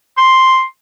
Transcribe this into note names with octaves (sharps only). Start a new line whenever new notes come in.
C6